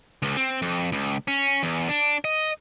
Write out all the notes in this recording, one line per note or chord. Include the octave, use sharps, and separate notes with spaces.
C#2
C4
F2
C#2
C#4
E2
D4
D#5